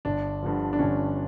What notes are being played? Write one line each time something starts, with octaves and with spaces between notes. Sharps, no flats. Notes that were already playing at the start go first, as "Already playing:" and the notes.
G1 D4
G2 D3 F3
D4
G1 C#4